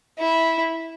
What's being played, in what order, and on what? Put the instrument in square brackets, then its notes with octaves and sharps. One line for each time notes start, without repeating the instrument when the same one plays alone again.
[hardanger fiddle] E4